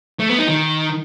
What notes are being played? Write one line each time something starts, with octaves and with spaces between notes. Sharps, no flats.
A3
B3
D#4
D#3